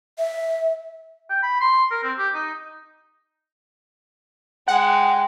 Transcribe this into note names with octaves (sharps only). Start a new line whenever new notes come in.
E5
G5
B5
C6
A#4
C4
G4
D#4
G#3 F#5 G5